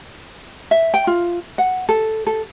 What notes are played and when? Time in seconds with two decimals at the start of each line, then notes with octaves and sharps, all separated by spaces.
0.71 E5
0.94 G5
1.07 F4
1.58 F#5
1.89 A4
2.27 A4